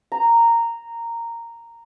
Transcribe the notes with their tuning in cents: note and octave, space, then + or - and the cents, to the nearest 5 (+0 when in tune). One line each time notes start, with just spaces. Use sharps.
A#5 -10